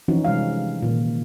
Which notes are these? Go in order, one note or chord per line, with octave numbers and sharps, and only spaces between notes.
E3 F3 C4 C#4 D#4 F#4
C3 G3 G#3 F5
A#2 D#3